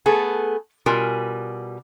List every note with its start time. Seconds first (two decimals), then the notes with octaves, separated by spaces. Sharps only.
0.06 A3 B3 G#4 A4
0.86 B2 G3 F4 A#4 G#5